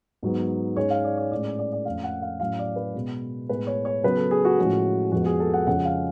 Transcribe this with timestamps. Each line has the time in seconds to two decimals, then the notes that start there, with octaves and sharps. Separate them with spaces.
0.23 G#2 F#3 B3
0.76 G#2 G#3 C#4 C#5
0.90 F5
1.04 D5
1.18 C#5
1.31 A2 G#3 C#4 D5
1.45 D5
1.59 D5
1.72 D5
1.85 F2 F3 A3 C#4 F5
2.04 F#5
2.22 F5
2.40 A2 F#3 C#4 F5
2.59 D5
2.76 B4
2.94 B2 G#3 B3
3.49 A2 G#3 B3 B4
3.67 C#5
3.85 C#5
4.03 C#3 F#3 B3 B4
4.17 A4
4.31 G#4
4.45 F#4
4.58 A2 F3 G#3 C#4
5.12 F2 F3 G#3 B3 F#4
5.26 G#4
5.40 A4
5.54 F#5
5.67 F2 C#3 F3 G#3 C#4 F#5
5.85 F5